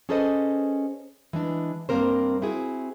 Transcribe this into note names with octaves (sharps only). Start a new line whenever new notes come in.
C#4 G#4 A4 B4 C5 D#5
E3 G#3 D4
G2 C3 A#3 C4 A#4 C5
C4 E4 F#4 G#4